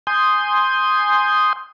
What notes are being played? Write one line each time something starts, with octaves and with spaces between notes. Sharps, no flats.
G#5 C6 D#6 G6